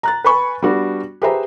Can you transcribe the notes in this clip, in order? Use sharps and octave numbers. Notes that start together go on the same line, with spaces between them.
A#5 F#6 A6
B4 G#5 B5 C#6
G3 B3 D4 F#4
G4 G#4 B4 C5 E5 A#5